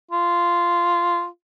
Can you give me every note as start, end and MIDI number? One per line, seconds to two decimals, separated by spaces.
0.11 1.26 65